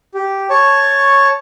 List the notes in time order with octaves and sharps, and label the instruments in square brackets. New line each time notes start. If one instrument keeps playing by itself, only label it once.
[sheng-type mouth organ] G4
C#5 A5 C#6